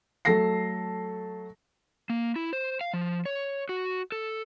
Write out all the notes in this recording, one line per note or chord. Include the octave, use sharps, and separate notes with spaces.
F#3 A3 A4 A5 A#6 C7
A#3
E4
C5
F5
F3
C#5
F#4
A4